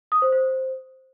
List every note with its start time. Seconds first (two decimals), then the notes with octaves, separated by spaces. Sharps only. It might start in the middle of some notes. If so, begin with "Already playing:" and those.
0.12 D#6
0.22 C5
0.32 C5